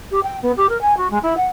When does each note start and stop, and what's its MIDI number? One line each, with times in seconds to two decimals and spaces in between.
0.11 0.20 67
0.23 0.37 79
0.42 0.52 59
0.57 0.69 67
0.69 0.80 70
0.81 0.97 80
0.97 1.10 66
1.10 1.18 56
1.23 1.36 64
1.37 1.46 78